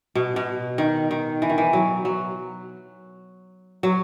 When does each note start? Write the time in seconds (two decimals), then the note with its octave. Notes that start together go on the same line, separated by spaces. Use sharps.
0.15 B2
0.36 B2
0.78 D#3
1.11 D#3
1.42 E3
1.50 D#3
1.58 E3
1.73 F#3
2.05 F#3
3.83 F#3